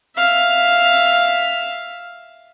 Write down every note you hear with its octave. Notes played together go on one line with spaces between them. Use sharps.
E5 F5